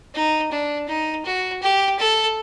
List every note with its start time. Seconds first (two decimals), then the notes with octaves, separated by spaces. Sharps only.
0.15 D#4
0.51 D4
0.88 D#4
1.25 F#4
1.62 G4
1.99 A4